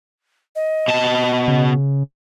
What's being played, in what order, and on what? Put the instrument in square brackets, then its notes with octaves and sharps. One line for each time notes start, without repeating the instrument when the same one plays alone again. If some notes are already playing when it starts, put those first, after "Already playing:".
[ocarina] D#5
[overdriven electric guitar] B2 A5
[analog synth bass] C#3